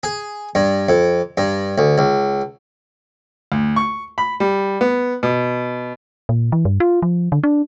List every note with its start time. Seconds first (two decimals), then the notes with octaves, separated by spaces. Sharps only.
0.03 G#4
0.55 G2
0.89 F2
1.37 G2
1.78 D2
1.98 C#2
3.52 D2
3.76 C#6
4.18 B5
4.40 G3
4.81 B3
5.23 B2
6.29 A#2
6.52 E3
6.65 G2
6.80 F4
7.02 F3
7.32 D3
7.44 D4